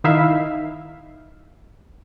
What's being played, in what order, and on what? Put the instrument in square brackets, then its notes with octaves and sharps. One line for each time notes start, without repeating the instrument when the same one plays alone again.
[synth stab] D#3 D#4 E4 E5 F5